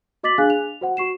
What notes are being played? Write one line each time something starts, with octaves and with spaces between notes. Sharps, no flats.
F#4 D#5 D6 A6 B6 F#7
D4 G#4 F5 G#5 F#6
F7
F#4 C5 F#5
F#4 C#6 C7 E7